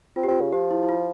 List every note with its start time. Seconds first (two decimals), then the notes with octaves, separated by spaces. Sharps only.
0.16 C4 F4
0.23 G4
0.28 C4 F4
0.41 C#3
0.53 F3 G4
0.71 E4
0.83 E4
0.89 F4